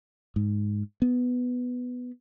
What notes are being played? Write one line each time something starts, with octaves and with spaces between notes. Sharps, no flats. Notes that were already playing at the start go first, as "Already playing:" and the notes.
G#2
B3